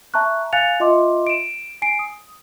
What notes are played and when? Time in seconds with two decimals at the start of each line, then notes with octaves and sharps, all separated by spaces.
0.14 E5 A5 A#5 C#6 F#6
0.53 F5 G#5 F#6 A6 C#7 F7
0.80 F4 D#5 E5 C6 D6
1.27 D7 E7
1.82 G#5 C7 D7
1.99 D#6